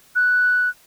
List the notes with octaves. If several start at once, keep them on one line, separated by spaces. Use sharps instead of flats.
F#6